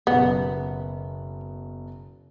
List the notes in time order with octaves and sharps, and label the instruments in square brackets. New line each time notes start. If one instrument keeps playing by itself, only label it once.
[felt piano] F#1 B2 [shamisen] B3